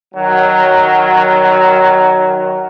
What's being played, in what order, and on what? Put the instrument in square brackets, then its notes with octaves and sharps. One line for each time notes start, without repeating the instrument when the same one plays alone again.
[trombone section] D#3 F#3